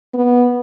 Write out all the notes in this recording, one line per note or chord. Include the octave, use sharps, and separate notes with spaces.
B3